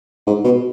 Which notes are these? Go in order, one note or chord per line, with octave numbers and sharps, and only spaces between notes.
G#2
B2